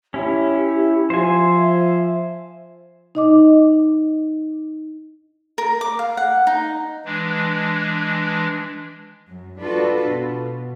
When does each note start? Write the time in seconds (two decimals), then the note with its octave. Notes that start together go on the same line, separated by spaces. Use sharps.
0.14 C#4 E4 G4
1.10 F3 C5 E5 G#5
3.15 D#4 D#5 D6
5.58 A#4
5.81 D6
5.99 F5
6.17 F#5
6.47 D#4
7.05 E3 G#3 D4
9.29 F#2
9.60 D4 F4 F#4 A4 B4
10.08 B2